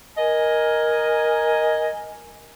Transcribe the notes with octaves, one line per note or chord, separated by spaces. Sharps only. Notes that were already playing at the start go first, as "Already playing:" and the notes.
A#4 D#5 G#5